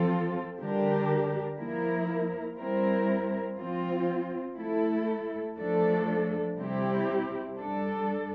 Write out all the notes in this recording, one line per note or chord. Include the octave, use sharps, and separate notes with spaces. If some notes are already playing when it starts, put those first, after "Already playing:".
Already playing: F3 C4 F4 A4
D3 G3 D4 G4 A#4
F3 A#3 E4 A#4
G3 C4 E4 A#4
F3 C4 F4
A3 E4 A4
F3 A3 D4 A4
C3 G3 C4 E4 G4
G3 D4 A4